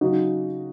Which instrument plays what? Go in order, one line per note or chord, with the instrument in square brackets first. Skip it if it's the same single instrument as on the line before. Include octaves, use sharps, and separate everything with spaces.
[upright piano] C#3 F#3 D#4 F#4